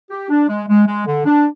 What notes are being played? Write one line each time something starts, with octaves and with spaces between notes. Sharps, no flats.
G4
D4
G#3
G#3
G#3
D3
D4